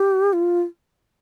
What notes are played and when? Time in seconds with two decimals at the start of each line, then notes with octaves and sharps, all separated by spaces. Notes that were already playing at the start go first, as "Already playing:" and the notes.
Already playing: G4
0.33 F4